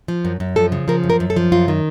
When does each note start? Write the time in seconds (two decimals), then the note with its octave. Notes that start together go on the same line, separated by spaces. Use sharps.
0.08 F3
0.25 F#2
0.40 F#2
0.56 F3 A4
0.72 C#3
0.88 F3 A#4
1.04 F#2
1.10 A#4
1.20 F#2
1.30 A4
1.36 F3
1.52 F#2 F4
1.68 D#3